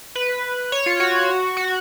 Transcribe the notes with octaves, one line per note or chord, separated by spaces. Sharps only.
B4
C#5
F4
F#4
F#4